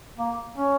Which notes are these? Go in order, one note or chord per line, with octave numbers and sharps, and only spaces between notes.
A#3
C#4